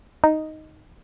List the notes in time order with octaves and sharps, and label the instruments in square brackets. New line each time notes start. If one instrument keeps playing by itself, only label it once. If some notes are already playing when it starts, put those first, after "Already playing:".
[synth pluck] D#4